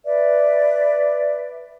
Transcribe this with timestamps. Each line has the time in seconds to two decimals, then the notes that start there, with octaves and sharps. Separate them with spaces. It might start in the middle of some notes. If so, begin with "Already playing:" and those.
0.06 B4 D5 E5